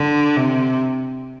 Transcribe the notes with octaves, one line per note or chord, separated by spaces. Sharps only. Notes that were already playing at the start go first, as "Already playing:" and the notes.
Already playing: D3
C3